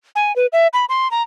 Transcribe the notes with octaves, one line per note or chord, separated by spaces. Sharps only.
G#5
B4
E5
B5
C6
A#5